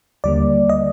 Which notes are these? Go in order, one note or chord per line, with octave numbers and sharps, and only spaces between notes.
D#2 D3 G3 A#3 D5
D#5